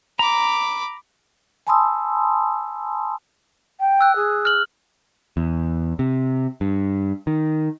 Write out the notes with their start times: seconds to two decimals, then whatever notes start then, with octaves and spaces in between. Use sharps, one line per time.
0.19 A#5 B5 D6
1.67 G#5 A5 B5 C6 D#6 E6
3.80 G5
4.01 E6 F#6
4.15 G#4
4.45 F6 F#7
5.37 E2
5.99 C3
6.61 G2
7.27 D#3